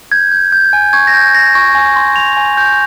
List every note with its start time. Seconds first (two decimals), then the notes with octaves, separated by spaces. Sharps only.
0.12 G6 G#6
0.32 G6
0.52 G6
0.73 G#5
0.93 C#6 G#6
1.07 A#6
1.14 G6
1.34 G6 A#6
1.55 C#6
1.75 G#5
1.96 C6
2.16 C6 F7
2.37 G#5
2.57 G6